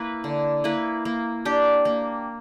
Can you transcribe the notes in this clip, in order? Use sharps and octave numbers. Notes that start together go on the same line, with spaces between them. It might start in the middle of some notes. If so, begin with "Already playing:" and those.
Already playing: A#3 E4 B4
D3
A#3 E4 B4
A#3
D4 G4
A#3